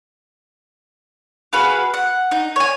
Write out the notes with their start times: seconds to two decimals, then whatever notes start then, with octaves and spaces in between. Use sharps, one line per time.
1.53 F#4 G#4 B4 F5
1.94 F#5
2.31 D#4
2.56 C#5 G#5